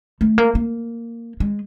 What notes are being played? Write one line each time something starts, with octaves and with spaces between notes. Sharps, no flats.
A3
A#3
A#3
G#3